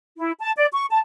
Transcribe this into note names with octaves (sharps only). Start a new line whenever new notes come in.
E4
A5
D5
C#6
A5